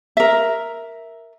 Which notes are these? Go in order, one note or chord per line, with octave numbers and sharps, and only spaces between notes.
A#4 E5